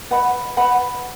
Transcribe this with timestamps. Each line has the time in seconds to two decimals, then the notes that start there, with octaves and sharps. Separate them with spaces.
0.11 B4 D#5 F#5 B5
0.57 B4 D#5 F#5 B5